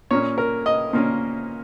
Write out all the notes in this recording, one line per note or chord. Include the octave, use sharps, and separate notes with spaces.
A#2 A#3 C#4 C#5
A#4
D#5
A#2 A#3 C#4